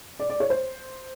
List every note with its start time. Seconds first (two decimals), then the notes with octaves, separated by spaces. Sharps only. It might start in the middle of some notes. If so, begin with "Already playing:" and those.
0.19 D5
0.30 D5
0.40 C#5
0.50 C5